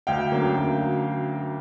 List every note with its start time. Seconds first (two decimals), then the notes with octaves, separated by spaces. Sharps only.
0.07 D2 F5 G5
0.32 D3 F#3 A#3 C#4
0.57 D2